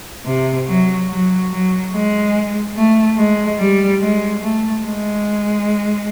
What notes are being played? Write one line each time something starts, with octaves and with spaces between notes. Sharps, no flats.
C3
F#3
F#3
F#3
G#3
A3
G#3
G3
G#3
A3
G#3